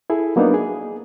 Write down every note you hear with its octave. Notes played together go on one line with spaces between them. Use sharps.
E4 G#4 A4
F#3 A#3 B3 D4 D#4
G#4